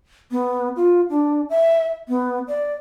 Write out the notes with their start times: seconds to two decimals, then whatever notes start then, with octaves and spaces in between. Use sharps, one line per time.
0.31 B3
0.76 F4
1.10 D4
1.50 E5
2.09 B3
2.48 D5